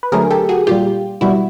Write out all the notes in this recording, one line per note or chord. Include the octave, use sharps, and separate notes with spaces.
B4
D3 F#3 A3 G#4 A#4
G4 A4
F#4 G#4
A#2 G3 F4 G4
B2 G3 E4 F#4